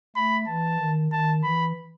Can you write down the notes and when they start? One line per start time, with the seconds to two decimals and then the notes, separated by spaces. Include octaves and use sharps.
0.16 A3 B5
0.47 E3 A5
0.79 D#3
1.12 D#3 A5
1.43 E3 B5